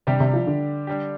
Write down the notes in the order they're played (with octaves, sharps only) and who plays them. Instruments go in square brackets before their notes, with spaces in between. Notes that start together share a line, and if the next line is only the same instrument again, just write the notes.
[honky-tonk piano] C3 [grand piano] G3 D4 G4
[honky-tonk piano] C3
F3
D3
[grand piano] G3 D4 G4